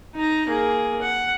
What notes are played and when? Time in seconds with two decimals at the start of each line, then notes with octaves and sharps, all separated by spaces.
0.16 D#4 A#5
0.48 A#3 G#4
1.02 F#5